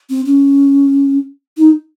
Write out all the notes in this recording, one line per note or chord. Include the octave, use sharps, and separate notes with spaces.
C4
C#4
D#4